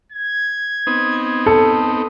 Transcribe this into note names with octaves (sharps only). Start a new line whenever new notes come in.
G#6
B3 C4 D#4
A4